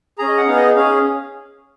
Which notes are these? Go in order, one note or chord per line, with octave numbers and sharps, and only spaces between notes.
C#4 G#4 A#5
D#5
F#5
B3 D#4 G#4 F5
D#5
C#4 G#4 F5